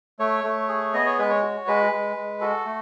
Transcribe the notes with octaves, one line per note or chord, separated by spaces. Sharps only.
A3 C#5
A3
G#4
B3 D#5
C#5
G#3 B4
C#5
F#4
G#3 B4
G#3
G#3
F#4 A4
A3